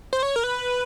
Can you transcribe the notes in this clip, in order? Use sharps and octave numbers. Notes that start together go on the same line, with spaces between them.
C5
C#5
A#4
B4